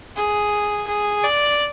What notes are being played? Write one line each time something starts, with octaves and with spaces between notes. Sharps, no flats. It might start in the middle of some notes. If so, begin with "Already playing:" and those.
G#4
G#4
D5